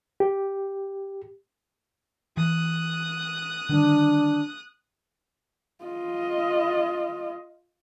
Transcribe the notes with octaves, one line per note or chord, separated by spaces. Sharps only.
G4
E3 D#6 F#6
D3 D#3 G3 D4
F4 D#5